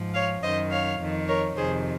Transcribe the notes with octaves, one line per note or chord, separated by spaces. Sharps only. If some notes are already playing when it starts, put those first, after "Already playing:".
Already playing: G#2 F3
C#5 F5
F#2 D#3 C5 D#5
C#5 F5
F2 D#3
A#4 C#5
F2 C3 D#3 G#4 C5